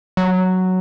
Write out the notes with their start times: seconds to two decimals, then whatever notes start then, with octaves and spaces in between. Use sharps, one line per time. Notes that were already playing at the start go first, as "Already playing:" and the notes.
0.17 F#3